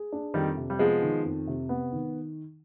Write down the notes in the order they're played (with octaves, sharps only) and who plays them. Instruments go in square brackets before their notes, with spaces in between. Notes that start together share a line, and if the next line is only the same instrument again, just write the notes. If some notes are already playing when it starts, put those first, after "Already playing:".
Already playing: [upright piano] G#4
D4
[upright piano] F2 [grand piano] D#3 G3
[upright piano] C3
[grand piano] G3
[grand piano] F3 G#3 [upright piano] B3
[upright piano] D#3
F2
C3
B3
D#3